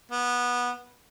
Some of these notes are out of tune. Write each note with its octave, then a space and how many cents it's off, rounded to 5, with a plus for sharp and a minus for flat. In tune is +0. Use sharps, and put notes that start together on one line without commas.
B3 -15